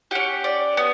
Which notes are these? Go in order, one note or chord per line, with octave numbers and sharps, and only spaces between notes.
C#4 G4 F#5
D5
B3